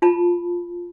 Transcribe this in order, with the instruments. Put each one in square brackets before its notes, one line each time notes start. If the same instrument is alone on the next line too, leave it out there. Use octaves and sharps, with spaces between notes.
[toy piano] F4 A5 B5